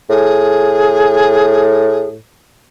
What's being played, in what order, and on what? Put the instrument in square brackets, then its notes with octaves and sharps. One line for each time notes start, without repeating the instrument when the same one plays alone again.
[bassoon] A2 [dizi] G#4